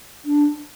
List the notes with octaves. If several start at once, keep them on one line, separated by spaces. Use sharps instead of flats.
D4